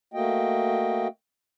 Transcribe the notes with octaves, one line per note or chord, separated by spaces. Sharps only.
A3 A#3 F#4 D#5 G5